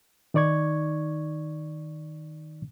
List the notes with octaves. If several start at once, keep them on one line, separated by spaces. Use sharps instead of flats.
D#3 D#4 D5 C#6 G#6